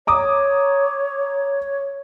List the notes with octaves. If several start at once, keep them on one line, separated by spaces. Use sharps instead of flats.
C#5 A#5 D6 D#6